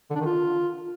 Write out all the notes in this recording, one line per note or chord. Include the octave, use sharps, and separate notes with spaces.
D3
D4
D#3
F4